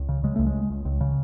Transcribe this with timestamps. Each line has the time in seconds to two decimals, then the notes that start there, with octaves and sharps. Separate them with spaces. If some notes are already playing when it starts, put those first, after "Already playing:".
Already playing: C#2
0.09 C#3
0.24 C#3 G#3
0.36 C#2 A3
0.47 G#3
0.55 C#2
0.70 C#2
0.85 C#2
1.01 C#3